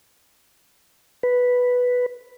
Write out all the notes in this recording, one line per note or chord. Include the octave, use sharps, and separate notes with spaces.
B4